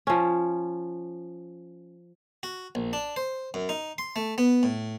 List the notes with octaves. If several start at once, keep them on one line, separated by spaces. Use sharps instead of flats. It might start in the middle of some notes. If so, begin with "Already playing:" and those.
F3 C#4
F#4
A#1
D4
C5
F#2
D#4
C6
A3
B3
A2